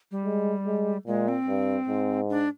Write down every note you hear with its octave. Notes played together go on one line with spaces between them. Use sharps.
G3
G#3
G#3
A#2 G#3
C4
G2
G#2
D4